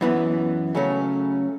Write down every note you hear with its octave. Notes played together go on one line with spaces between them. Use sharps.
F#2 E3 B3
C#3 F#3 A3 C#4